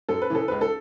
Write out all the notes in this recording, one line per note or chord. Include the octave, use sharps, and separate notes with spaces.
F#2 A4
B4
C#3 E3 A4
C#2 B4
A4